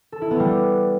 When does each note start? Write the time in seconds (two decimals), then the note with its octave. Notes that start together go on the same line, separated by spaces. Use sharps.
0.12 A4
0.22 E4
0.31 B3
0.40 G3